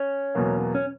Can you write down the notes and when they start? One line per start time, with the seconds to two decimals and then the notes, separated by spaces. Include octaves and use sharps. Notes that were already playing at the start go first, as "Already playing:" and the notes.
Already playing: C#4
0.35 E2 B2 F#3 A#3
0.75 C#4